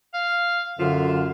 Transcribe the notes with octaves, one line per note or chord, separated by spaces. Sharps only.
F5
F#2 D3 F4 E5